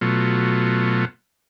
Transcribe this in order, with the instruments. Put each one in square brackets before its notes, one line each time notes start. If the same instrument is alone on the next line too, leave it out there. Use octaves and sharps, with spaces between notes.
[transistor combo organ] B2 F#3 A3 F4